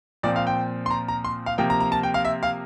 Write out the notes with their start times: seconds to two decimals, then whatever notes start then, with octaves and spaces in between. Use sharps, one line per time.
0.23 A#2 F3 C4 D5
0.36 F5
0.47 G5
0.86 C6
0.91 A#5
1.08 A#5
1.24 C6
1.46 F5
1.58 C3 F3 A#3 G5
1.70 A#5
1.80 A#5
1.92 A5
2.03 G5
2.14 F5
2.25 E5
2.43 F5